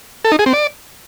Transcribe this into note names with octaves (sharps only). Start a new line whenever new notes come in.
A4
D#4
G#4
C4
D5